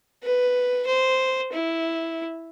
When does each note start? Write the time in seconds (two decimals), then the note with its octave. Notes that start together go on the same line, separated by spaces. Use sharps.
0.24 B4
0.87 C5
1.53 E4